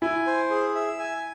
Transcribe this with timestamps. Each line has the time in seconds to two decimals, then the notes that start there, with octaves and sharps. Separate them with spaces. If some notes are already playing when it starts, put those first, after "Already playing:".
0.02 E4 G#5
0.27 C5
0.50 G#4
0.75 E5
0.99 G#5